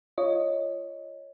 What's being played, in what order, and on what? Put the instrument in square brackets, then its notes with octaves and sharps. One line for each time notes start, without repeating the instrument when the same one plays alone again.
[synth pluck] F4 C#5 D#5